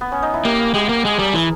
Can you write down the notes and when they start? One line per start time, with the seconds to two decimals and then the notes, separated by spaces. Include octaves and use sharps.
0.01 B3
0.12 C#4
0.23 D#4
0.34 E4
0.45 A#3 G4
0.74 G#3 G4
0.89 A#3
1.05 G#3 G#4
1.19 G3 A#4
1.34 E3 A#4